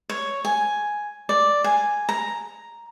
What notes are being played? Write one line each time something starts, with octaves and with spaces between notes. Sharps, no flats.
C#5
G#5
D5
G#5
A#5